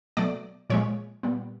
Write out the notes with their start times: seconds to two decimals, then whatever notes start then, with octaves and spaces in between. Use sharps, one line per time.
0.17 B2 F#3 A3 D5
0.70 A#2 F3 G#3 C#5
1.23 A#2 G3 B3